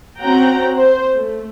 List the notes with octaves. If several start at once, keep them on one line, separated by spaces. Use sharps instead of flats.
C4 C#4 F#4 F#5 G5 A#5
C5
A3